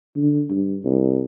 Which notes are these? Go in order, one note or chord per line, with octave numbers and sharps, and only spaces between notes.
D3
G2
C2